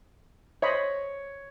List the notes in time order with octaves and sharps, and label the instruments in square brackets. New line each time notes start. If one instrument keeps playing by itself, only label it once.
[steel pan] C5 D#5 B5 [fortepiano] C#5